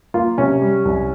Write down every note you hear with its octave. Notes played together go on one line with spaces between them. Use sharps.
A#3 F4
C3 C#4
G3
C2